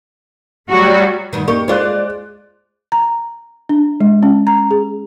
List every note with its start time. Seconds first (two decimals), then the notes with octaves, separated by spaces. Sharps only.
0.69 F#3 G3 A3 F#4
1.33 D2 G2 D#3
1.48 A#3 D#4 G4 C#6
1.68 G#3 F4 C5 D5 F#6
2.92 A#5
3.69 D4
4.01 G#3
4.23 C#4
4.47 A#5
4.71 G#4